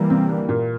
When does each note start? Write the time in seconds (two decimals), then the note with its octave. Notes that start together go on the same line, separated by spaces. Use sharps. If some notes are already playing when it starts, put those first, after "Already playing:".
Already playing: E3 G3 A#3
0.10 C3 C4
0.29 D3 D4
0.49 A#2 A#3